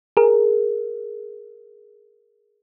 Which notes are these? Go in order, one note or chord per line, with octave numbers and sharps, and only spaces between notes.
G#4 A#4